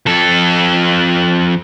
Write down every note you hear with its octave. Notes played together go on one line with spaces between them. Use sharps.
F2 A4